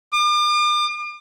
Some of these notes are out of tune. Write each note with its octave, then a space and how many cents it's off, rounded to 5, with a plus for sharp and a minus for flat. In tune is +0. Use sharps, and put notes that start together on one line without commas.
D6 +40